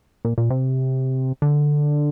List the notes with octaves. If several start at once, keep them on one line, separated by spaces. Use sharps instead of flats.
A#2
A#2
C3
D3